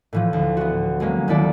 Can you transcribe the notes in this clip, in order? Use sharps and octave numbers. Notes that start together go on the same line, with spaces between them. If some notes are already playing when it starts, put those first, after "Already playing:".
A2 E3 F3
D2
B3 F#4
F#3 G#3 A#3 C#4
D#2 D#3 E4 A4 D5